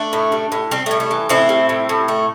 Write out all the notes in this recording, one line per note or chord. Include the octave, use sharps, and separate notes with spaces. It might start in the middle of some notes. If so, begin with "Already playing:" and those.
Already playing: A3 D4
A2
G3
A2
G3 C4
A2 A3
A3
E3
A2 C4 E4
G3
A2
A2
A3